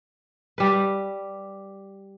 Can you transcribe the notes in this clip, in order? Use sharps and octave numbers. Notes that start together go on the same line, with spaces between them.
G3 B4